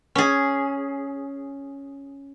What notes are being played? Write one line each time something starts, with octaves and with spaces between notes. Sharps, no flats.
C#4 G#4